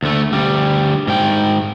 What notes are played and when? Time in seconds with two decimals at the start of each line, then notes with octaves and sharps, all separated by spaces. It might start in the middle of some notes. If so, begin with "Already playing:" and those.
0.02 D2 A3
0.32 D2 G3
1.07 G#2 G5